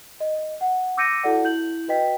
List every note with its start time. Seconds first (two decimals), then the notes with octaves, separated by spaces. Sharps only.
0.20 D#5
0.61 F#5
0.97 D6 E6 G6 A#6 C#7 D#7
1.23 E4 F#4 A4 D5 F#5
1.44 E4 G6 F#7
1.88 F#4 B4 D#5 G5 B6